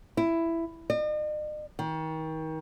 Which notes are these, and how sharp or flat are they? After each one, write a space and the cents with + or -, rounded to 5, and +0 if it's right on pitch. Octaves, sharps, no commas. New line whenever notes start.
E4 +10
D#5 -45
D#3 +35